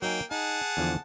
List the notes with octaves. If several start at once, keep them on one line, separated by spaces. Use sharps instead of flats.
F#3 A#3 D#4 G5 G#5
D#4 G#4 F#5 A5
E2 D3 F3